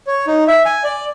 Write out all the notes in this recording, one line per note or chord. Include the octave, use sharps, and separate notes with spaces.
C#5
D#4
E5
G#5
D5